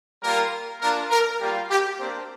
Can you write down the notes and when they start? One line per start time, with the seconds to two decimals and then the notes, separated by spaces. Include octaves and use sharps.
0.22 G3 A#3 F4 A#4
0.81 A#3 D4 F4 A#4
1.10 A#4
1.40 G3 A#3 F4 G4
1.69 G4
1.99 A#3 C4 D4 G4 C5